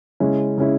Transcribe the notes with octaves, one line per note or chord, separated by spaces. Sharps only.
C#3 G#3 C#4 E4
C#3 G#3 C#4 E4